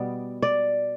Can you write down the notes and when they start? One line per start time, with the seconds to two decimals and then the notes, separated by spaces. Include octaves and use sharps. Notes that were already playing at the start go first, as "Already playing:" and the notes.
Already playing: B2 G3 B3 D5
0.42 D5